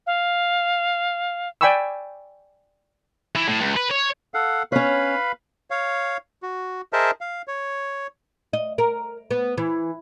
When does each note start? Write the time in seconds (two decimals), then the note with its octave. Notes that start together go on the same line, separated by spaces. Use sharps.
0.07 F5
1.61 D5 G5 G#5 B5 C#6 E6
3.36 E3
3.48 A2
3.61 C#2
3.76 B4
3.91 C#5
4.34 A4 F5 F#5
4.72 C#4 B4 C#5 F5 B5
5.71 C#5 F5
6.43 F#4
6.93 G#4 A#4 C5 D#5 E5 A5
7.21 F5
7.48 C#5
8.53 D#5
8.78 A#4
9.31 B3
9.58 E3